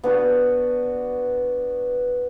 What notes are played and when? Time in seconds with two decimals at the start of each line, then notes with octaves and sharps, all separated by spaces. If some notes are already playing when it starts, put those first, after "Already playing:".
0.04 B3 D4 F#4